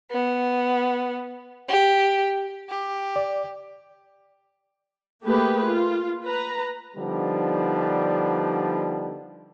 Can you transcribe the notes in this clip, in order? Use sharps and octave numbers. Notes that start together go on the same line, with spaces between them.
B3
G4
G4
D5
A3 A#3 G4 G#4 B4
F4
B4 A#5
D3 F3 G3 B3 D4 D#4